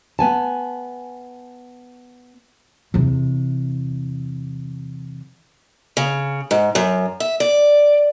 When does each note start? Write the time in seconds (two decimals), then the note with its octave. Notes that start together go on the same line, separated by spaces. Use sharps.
0.19 B3 G#5 A5
2.94 E2 C3
5.97 C#3
6.51 G#2
6.75 F#2
7.20 E5
7.40 D5